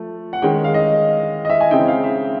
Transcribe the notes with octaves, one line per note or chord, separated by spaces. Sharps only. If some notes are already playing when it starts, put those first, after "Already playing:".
Already playing: F3 A3
F#5
D#3 G#3 C#4 G5
F5
D#5
D#5
E5
G#5
C#3 E3 G#3 C4 D#4 G5
F5
E5